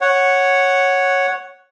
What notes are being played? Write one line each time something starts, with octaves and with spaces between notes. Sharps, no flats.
C#5 F#5